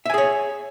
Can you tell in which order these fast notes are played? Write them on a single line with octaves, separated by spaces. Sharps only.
E5 G#5 G#4 C#5